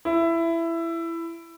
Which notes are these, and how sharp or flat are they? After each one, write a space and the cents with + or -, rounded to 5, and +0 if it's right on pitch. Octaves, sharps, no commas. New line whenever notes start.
E4 +15